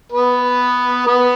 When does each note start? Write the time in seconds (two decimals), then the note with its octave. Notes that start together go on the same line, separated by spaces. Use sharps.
0.12 B3 B4
1.06 B3 B4